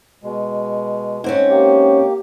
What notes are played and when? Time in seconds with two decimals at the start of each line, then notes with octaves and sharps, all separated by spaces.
0.23 B2 G#3
1.24 G#2 C4 C#4
1.50 A#3 G4